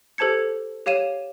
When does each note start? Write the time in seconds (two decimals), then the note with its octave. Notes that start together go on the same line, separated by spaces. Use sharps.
0.18 G4 A4 C5 A5 G#6 C#7
0.86 G4 C#5 F5 D#7 E7